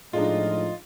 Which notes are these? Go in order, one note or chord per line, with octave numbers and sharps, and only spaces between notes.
A2 F3 G#3 D4 D#4 F4 D#5